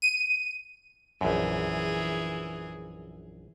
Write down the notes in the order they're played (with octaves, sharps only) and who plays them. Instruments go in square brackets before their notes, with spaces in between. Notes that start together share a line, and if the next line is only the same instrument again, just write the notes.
[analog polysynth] D#7
[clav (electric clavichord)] A#1 F#2 [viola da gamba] E3 G#4